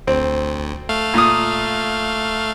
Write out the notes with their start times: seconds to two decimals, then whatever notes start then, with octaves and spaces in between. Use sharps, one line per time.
0.07 D2 C4
0.89 A3 F5
1.14 A#2 D#6